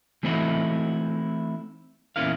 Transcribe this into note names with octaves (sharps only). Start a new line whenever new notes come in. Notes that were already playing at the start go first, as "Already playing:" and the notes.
E3 A3 C4 D#4 E4 F#4
E2 A#2 C#4 E4 A#4 F5